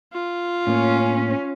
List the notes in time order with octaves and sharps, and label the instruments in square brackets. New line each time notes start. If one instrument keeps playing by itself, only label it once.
[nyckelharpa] F4
[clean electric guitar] A2 A#3 [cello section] C#4